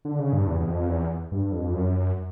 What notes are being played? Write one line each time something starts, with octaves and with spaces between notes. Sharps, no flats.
D3
C#3
G2
E2
E2
F2
E2
G2
F2
F#2